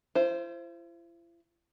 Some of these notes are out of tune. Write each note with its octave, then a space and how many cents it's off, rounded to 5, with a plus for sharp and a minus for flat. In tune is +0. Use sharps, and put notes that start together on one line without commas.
E4 +45 C5 +0